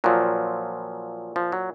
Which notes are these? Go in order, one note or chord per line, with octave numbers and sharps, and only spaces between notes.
A#2 F3 F#3
F3
F#3